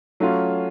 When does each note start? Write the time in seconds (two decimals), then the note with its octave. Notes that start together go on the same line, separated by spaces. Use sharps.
0.20 F#3 A3 C#4 F4